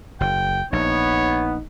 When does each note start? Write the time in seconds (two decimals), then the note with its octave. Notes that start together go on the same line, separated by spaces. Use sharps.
0.20 F#1 G5
0.73 A#1 B3 D#4 C#5